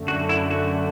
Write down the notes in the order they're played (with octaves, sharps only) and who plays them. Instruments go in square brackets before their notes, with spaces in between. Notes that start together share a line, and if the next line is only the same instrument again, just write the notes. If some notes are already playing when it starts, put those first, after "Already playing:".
Already playing: [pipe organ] F#2 D3 A3
[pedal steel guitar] F#4
E4
F#4